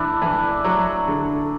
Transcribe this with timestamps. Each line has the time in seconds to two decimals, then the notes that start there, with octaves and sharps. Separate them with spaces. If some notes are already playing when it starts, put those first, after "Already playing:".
Already playing: E3 D4 E4
0.22 E3
0.64 F#3
1.07 D3